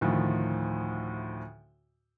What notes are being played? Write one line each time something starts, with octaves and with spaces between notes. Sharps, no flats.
D2 A2 D#3 F3